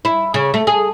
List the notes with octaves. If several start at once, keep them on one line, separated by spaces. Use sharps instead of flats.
E4
C#3
A3
G#4